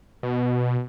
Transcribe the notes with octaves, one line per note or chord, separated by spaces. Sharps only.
B2